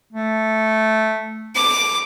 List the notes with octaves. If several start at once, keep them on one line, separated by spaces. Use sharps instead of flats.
A3
D6